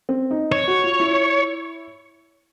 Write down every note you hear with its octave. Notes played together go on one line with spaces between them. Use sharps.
C4
D#4
C#5
F#4
F4
E4